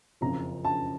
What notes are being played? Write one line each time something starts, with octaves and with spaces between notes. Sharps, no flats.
F#1 F2 C#3 F3 A#5
A5